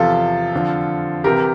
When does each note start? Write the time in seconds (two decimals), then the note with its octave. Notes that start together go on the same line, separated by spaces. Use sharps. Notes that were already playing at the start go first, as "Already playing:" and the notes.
Already playing: E2 C3 F3 F4 A4
0.52 F2 D3 F3
1.24 C2 C3 E3 G4 A#4